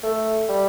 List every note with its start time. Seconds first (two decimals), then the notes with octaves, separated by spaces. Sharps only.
0.03 A3
0.49 G3